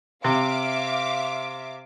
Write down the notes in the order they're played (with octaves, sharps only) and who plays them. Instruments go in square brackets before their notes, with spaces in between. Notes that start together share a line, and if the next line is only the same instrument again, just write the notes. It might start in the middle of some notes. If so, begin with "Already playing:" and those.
[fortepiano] C3 [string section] E5 F5 D6